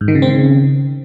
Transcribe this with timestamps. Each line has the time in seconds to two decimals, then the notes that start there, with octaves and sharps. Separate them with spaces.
0.01 G#2
0.08 D#3
0.15 C#3
0.22 C4
0.29 C#3